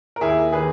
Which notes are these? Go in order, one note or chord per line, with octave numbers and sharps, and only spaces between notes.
A#4
D#2 E4 G#4
D#3 G#4 B4